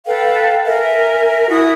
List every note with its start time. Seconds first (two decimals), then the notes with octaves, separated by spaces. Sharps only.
0.06 A4 B4 F5 G5
0.65 A#4 E5 G#5
1.50 E4 F#4 E5 D#6